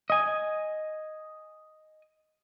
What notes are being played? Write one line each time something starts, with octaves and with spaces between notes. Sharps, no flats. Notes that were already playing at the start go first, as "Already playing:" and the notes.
D#5 G#5